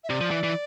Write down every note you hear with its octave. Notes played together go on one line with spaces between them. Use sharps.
E5
C3 D5
F3
E3
E3